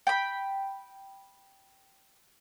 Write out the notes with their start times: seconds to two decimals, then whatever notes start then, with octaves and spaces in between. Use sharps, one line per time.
0.07 G5 B5